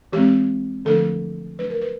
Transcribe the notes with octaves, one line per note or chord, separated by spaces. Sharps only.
E3 G#3 C4 G4
D3 F3 A3 D4 A4
F#3 A3 D4 B4
A#4
B4